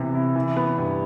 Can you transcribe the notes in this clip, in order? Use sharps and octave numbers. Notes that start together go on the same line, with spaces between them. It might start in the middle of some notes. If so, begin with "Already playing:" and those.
Already playing: C3 E3 B3
E4
E3
B3
G2